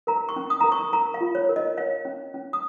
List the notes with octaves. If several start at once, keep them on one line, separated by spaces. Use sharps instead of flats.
A#4 A#5
C#6
C#4
D#6
A#4 A#5
C#6
A#4 A#5
F5
F4
C#5
A#4
D#5
C#5 F5
C#4
C#4
D#6